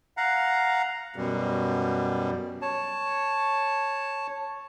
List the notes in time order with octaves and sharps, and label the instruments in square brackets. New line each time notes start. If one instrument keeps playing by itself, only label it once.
[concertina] F5 F#5 A#5
[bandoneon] F#2 B2 G3
C#5 A5